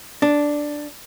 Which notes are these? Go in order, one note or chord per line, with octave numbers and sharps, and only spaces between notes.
D4